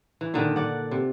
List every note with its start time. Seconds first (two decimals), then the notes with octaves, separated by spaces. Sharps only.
0.21 E3
0.34 A#2 D3 D#3
0.56 D5 F#5
0.91 C3